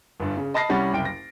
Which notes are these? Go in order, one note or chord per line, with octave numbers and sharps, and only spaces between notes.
G1 G2
C#3
D#5 A5 B5 A#6 C7
C2 G3 C#4 F#5 B5 A6
F#1 C2 G5 D7
A#6